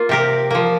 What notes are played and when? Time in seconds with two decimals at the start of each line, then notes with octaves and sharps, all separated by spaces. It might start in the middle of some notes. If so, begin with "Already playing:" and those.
Already playing: A#3 F4
0.09 C3 G4 A#4
0.51 F3 A#3